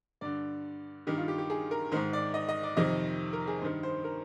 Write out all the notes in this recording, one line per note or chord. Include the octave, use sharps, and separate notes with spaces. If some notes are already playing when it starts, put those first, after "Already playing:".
G2 D3 D5
G2 D#3 G4
F4
G4
G4
G#4
A#4
G#2 D#3 C5
D5
D#5
D#5
D5
F2 C3 D#3 D#5
A#4
G#4
G2 D#3 C5
C5
A#4